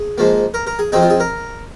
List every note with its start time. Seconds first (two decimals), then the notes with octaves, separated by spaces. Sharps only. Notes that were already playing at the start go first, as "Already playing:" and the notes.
Already playing: G#4
0.18 G#2 F3 A#3
0.54 A#4
0.67 A#4
0.79 G#4
0.92 F2 F3 C4 D#4 G#4
1.02 F4
1.10 G#4
1.20 A#4